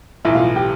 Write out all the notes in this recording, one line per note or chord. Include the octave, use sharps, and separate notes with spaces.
B1 A2 E3 E4 E5
F4 F5
G4 G5